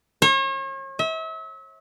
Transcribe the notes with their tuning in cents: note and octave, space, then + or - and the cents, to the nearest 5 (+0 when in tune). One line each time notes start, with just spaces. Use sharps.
C#5 -40
E5 -35